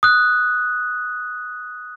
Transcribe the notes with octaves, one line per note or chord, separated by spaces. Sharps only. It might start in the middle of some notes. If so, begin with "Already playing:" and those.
D#6 F#6